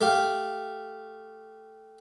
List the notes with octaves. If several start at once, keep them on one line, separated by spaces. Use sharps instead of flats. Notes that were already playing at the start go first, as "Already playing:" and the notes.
A3 G4 F5